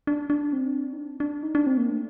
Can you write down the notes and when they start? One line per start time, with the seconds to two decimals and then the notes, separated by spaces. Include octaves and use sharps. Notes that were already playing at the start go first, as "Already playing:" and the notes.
0.07 D4
0.30 D4
0.53 C4
0.93 D#4
0.97 D4
1.20 D4
1.43 D#4
1.55 D4
1.67 C4
1.77 A#3
1.89 A3